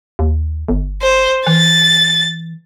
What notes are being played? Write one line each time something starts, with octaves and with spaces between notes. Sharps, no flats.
D#2
G1
C5
E3 A6